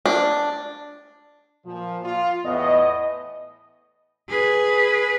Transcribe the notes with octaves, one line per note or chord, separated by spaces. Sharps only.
D4
A#2 F3
F4
E2 A2 B3 D#5
G#4 B4